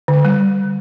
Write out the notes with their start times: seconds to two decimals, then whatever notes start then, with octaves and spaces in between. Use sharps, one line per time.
0.08 D3
0.25 G3